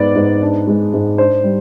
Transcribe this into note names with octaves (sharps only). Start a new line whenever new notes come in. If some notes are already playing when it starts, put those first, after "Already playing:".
Already playing: G#2 B3 D5
G#2
D4
G#3
G#2
D4 C5
G3